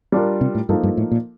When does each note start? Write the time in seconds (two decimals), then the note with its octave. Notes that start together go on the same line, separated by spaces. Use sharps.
0.12 G3 D4 F4 A#4
0.41 C3
0.55 A2
0.69 G2 F3 A#3 D#4 A4
0.83 G2
0.97 A2
1.11 A#2